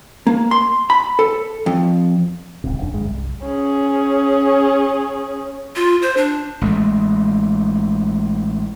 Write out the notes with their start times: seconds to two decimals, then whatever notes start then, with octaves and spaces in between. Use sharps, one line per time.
0.27 A#3
0.51 C6
0.90 B5
1.19 A4
1.66 F2
2.64 D1 C#2 C3
2.78 E1 F#2 D4
2.93 G1 G#3
3.08 C2
3.46 C#4 G#4
5.76 F4
6.02 C5
6.17 D4
6.61 A1 G#3 A3